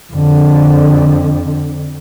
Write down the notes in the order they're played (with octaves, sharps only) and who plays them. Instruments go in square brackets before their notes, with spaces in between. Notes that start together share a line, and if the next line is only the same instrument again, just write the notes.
[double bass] F2 D3